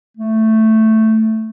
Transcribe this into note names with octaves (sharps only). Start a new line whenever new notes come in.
A3